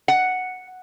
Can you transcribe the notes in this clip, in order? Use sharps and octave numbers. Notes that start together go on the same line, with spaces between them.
F#5